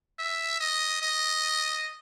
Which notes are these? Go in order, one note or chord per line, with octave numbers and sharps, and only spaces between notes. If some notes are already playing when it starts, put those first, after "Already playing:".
E5
D#5
D#5